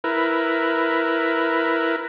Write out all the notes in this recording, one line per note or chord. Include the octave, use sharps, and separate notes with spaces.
E4 A#4 B4